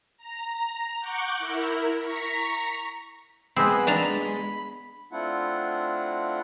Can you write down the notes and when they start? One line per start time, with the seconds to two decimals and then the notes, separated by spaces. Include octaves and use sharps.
0.18 A#5
1.01 F#5 C#6 D6 F#6 G6
1.37 E4 A#4
1.99 A#5 C#6 B6
3.56 G#3 B3 C4 G#4 B4 B5
3.87 D4 A5 A#5
5.12 A3 C4 D4 E4 F4 F#5